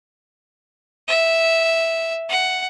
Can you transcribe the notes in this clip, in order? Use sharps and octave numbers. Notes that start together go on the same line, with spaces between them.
E5
F#5